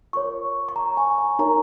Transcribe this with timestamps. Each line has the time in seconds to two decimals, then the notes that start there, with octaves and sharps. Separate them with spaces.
0.13 F4 A#4 C#5 C#6
0.69 C#6
0.76 A#5
0.97 G#5
1.18 G#5
1.39 D#4 A#4 C#5 A#5